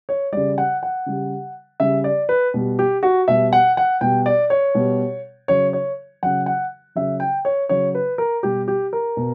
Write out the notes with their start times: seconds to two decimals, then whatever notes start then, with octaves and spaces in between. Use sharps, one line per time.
0.09 C#5
0.32 C#3 G3 D5
0.58 F#5
0.83 F#5
1.06 C#3 G3
1.80 C#3 G3 E5
2.04 D5
2.29 B4
2.54 B2 G3
2.79 G4
3.03 F#4
3.28 B2 G3 E5
3.53 F#5
3.77 F#5
4.01 B2 G3 G5
4.26 D5
4.50 C#5
4.75 B2 G3
5.48 C#3 F#3 C#5
5.73 C#5
6.23 C#3 F#3 F#5
6.46 F#5
6.95 C#3 F#3 E5
7.20 G5
7.45 C#5
7.69 C#3 F#3 C#5
7.95 B4
8.18 A#4
8.43 B2 G3 G4
8.68 G4
8.93 A#4
9.17 B2